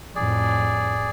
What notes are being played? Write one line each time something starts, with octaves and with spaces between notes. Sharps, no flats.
F2 A2 G#4 D5